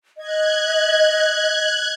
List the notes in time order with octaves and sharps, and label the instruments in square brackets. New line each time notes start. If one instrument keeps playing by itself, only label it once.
[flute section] D#5 [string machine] F#6 G#6